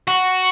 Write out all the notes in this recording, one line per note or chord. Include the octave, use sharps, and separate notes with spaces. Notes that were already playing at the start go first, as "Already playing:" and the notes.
F#4